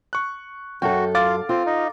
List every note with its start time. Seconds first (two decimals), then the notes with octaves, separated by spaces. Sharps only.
0.13 C#6 F#6
0.82 F#2 F#4 A4 G5
1.15 F4 F5 D6 A6
1.49 C4 F4
1.66 D#4